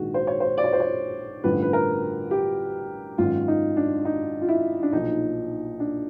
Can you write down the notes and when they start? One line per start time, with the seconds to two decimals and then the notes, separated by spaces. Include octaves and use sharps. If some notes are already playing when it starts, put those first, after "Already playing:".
Already playing: A#1 G#2 D#3 F#4
0.14 C5
0.27 C#5
0.40 C5
0.58 D5
0.64 C#5
0.73 C5
0.80 C#5
1.44 A1 G2 D3 F3 B4
1.62 B4
1.73 A#4
2.31 G4
3.18 G#1 F#2 D#3 F4
3.48 D#4
3.77 D4
4.05 D#4
4.41 F4
4.48 E4
4.83 D4
4.92 B1 A#2 F3 D#4
5.80 D4